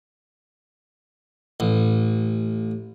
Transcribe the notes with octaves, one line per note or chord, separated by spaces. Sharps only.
A1